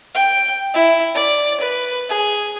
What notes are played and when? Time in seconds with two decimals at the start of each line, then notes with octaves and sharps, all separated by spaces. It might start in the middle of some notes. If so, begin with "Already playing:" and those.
0.15 G5
0.74 E4
1.15 D5
1.60 B4
2.09 G#4